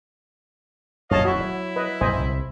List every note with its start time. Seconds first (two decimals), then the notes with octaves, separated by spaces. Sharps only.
1.11 D#1 F#2 C#5 D#5 F5 A5
1.25 E4 F#4
1.40 F#3
1.76 B4 D#5
2.01 A#1 F#2 C5 D#5 G#5
2.19 C2